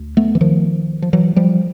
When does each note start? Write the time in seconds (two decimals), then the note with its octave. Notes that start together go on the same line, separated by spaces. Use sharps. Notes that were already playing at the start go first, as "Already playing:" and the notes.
Already playing: D2
0.17 A3 B3
0.35 E3
0.41 D#3 F3
1.02 F3
1.13 E3 F#3
1.36 F3 G3